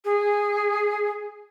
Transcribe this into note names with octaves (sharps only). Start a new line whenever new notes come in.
G#4